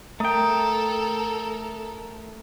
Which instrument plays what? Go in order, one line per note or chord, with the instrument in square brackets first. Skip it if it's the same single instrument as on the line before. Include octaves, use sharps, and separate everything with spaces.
[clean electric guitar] A3 G5 [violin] A4 A#4 [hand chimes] A#5 D#6